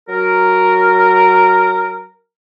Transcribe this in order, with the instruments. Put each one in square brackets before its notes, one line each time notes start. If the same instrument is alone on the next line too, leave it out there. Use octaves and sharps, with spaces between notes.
[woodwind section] F#3 A#4